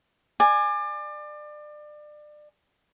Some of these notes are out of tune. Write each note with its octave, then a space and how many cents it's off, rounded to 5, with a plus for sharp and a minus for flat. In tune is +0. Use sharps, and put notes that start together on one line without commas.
D5 +30 G#5 -5